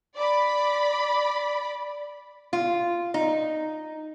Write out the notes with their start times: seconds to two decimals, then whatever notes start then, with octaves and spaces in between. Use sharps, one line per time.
0.16 D5 B5
2.53 F4
3.14 D#4